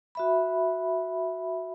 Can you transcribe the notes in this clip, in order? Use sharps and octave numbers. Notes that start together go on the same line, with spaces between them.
F#4 E5 B5